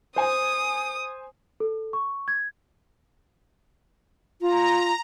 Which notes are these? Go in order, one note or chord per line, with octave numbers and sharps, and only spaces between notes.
C5 G#5 D#6
A4
C#6
G#6
F4 A#5